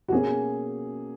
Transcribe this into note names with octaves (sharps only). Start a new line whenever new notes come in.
F#4
B2 A#3 C#4 G#4